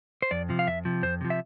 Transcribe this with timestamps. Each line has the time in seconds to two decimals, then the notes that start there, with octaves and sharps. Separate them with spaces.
0.22 C5
0.31 F2 D5
0.49 C3 F3
0.59 F5
0.67 F2 E5
0.85 C3 F3
1.03 F2 C5
1.21 C3 F3
1.30 E5